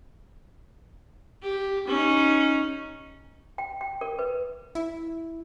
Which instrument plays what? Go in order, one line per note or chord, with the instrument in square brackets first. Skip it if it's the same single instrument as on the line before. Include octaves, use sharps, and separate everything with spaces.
[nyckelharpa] G4
C#4 D#4
[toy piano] G5
G5
A#4
B4
[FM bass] E4